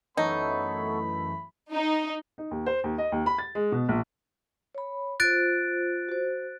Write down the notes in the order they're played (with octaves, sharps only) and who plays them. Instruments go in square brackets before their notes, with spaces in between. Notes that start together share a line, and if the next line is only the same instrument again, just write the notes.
[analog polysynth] F#2 E3 A3 [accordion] B3 A4 C#5 [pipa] D#4 [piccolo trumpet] B5
[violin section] D#4
[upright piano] D#4
D#2
C5
D#2
D#5
D#2
B5
A6
G#3
B2
A#1
[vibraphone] C#5 B5
[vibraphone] F4 C5 [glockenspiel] F#6 A6 D7
[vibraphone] F#4 C5